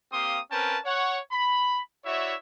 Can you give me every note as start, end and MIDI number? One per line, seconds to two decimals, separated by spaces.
0.12 0.39 58
0.12 0.39 60
0.12 0.39 67
0.12 0.39 77
0.12 0.39 84
0.12 0.39 87
0.51 0.77 60
0.51 0.77 61
0.51 0.77 70
0.51 0.77 71
0.51 0.77 79
0.51 0.77 81
0.85 1.18 73
0.85 1.18 78
1.31 1.79 83
2.05 2.35 64
2.05 2.35 66
2.05 2.35 73
2.05 2.35 74
2.05 2.35 76